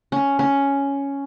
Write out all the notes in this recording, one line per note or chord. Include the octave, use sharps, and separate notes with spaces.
C#4
C#4